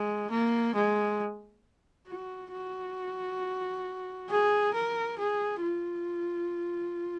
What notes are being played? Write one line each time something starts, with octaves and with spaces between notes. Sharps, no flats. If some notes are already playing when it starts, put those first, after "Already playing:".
Already playing: G#3
A#3
G#3
F#4
F#4
G#4
A#4
G#4
F4